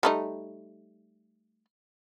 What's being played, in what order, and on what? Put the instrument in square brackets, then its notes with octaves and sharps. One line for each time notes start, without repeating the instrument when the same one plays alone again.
[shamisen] G3 A3 D#4